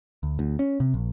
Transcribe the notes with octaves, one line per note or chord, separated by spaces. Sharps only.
D2
D2
C#4
C3
A#1